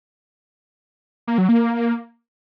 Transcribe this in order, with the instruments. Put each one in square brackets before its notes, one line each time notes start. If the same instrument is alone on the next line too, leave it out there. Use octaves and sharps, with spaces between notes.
[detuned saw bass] A#3
F#3
A#3